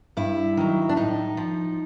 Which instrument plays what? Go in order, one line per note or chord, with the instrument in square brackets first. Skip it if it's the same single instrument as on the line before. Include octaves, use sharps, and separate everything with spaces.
[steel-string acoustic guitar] G2 E4
D#3 F#3
D4
A2 D#4
F3